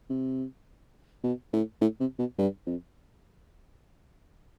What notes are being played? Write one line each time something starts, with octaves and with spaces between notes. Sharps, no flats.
C3
B2
A2
A2
C3
B2
G2
F2